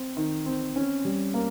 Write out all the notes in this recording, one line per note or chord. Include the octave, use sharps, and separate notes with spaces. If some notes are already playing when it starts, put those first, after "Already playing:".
Already playing: C4
D#3
C4
C#4
G3
A#3